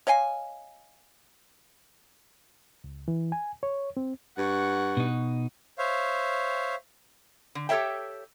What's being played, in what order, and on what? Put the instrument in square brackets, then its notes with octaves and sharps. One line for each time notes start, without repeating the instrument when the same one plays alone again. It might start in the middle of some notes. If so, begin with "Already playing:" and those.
[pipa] C#5 D#5 F5 G#5
[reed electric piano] C#2
E3
G#5
C#5
C4
[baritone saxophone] G2 [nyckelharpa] F#5 C#6
[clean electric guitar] B2 D#4
[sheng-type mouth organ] C5 C#5 E5 F5
[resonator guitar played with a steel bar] D3
G4 A4 A#4 C#5 E5 G5